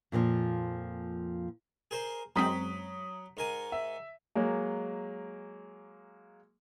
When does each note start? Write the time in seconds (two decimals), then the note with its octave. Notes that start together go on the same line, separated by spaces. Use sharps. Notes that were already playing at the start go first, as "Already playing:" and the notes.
0.12 F2 A#2 D#3 F3
1.91 G#4 A#4 C5
2.36 F#2 F#3 G#3 C4 A#5 B5 D#6 B6
3.37 G#2 A#4 G#5
3.72 E5
4.35 F#3 G#3 A#3